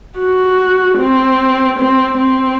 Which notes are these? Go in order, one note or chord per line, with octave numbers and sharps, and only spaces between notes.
F#4
C4
C4
C4